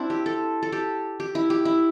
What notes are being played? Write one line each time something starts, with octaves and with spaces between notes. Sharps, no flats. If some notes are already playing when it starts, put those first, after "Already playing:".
Already playing: C4 D4 E4
G4
A4
A4
G4
G4
E4
G4
E4